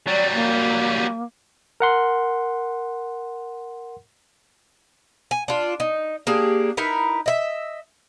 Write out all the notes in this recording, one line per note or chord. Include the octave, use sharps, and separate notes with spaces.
F#3 G3 D5
A#3
A#4 F#5 C6
G#5
D4 F4
D#4
A#3 D4 G4 G#4
D#4 E4 A#4 B4
D#5 E5